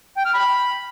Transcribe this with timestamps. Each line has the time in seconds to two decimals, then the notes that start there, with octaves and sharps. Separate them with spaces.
0.17 G5
0.25 F6
0.34 B5